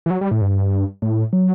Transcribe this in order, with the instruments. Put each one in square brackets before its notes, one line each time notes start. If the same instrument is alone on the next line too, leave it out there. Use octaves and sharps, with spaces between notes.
[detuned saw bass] E3
F#3
G3
A2
G2
A2
F#3